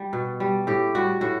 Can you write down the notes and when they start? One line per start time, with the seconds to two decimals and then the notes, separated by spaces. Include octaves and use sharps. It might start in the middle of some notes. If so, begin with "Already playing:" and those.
Already playing: G3
0.13 B2
0.40 G3
0.67 A2 G4
0.95 G3 F#4
1.21 A2 F#4